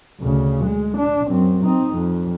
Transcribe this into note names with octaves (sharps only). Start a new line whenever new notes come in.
D2 C#3
G#3
D4
F#2 C4
C4 D#4
F2